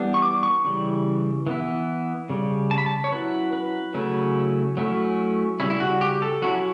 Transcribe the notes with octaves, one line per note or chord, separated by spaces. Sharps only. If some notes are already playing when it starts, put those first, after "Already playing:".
Already playing: E3 G3 B3 D4
C#6
D6
C#6
C#3 E3 G3
E3 B3 E4
C#3 G3
A5
B5
A5
C#5
F#3 C#4 E4 B4
B4
C#3 F#3 A3 C#4 E4
F#3 A3 C#4 E4
C#3 G3 C#4 E4
E4
F#4
G4
A4
F#3 C#4 E4 F#4